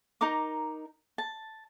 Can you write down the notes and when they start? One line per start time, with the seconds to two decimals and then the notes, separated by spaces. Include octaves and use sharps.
0.21 D#4 A#4 A#5 D6
1.18 A5